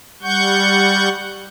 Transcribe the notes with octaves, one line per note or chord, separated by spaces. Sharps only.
G3 F#5 C#6 G6